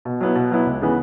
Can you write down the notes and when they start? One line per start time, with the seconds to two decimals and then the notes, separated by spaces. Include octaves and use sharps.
0.05 B2
0.21 F#3 B3 E4
0.35 B2
0.51 F#3 B3 E4
0.66 C#2
0.82 C#3 E3 B3